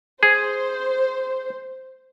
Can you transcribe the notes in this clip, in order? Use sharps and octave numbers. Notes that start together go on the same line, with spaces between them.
G#4 C5